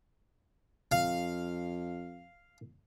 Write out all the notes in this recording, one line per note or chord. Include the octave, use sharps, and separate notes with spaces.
F2 F5